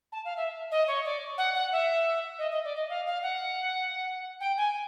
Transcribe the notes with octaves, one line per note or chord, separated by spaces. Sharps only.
A5
F5
E5
D#5
C#5
D5
F#5
F#5
E5
D#5
D#5
D5
D#5
F5
F5
F#5
G5
G#5